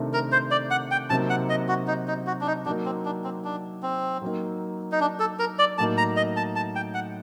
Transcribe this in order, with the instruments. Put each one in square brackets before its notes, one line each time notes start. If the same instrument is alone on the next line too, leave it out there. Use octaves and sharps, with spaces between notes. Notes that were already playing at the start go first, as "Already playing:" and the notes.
Already playing: [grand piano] C3 D#3 A3 D4
[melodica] A#4
C5
D5
F#5
G5
[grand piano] C3 F#3 A#3 D#4 [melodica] A5
[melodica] F#5
D#5
F#4
D#4
D#4
F#4
D4
D#4
[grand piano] F#3 A#3 D#4 [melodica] D4
[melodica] C4
D4
C4
D4
C4
[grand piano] F#3 A#3 D#4
[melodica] D#4
D4
A4
A#4
D5
[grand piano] A2 F#3 A#3 D#4 [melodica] A5
[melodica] A#5
D#5
A5
A5
G5
F#5